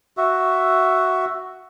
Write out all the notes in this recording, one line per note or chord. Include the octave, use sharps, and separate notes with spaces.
F#4 E5